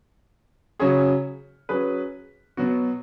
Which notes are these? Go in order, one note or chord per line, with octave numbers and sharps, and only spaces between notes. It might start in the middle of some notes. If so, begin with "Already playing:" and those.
C#3 F#3 C#4 G#4 C#5
F#3 C#4 G#4 B4
B2 F#3 B3 F#4